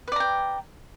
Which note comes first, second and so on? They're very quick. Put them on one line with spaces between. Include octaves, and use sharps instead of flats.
B4 D5 A#5 G5